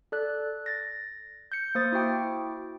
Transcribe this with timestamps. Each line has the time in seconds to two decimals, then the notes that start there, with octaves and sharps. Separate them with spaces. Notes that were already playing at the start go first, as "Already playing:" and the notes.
0.12 A4 D5 F#6
0.66 A6 A#6
1.52 G6 C#7
1.75 A#3 C5 D#6 A6
1.92 E4 F#4 G5 D6